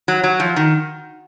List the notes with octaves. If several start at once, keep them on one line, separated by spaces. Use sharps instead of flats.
F#3
F#3
F3
D#3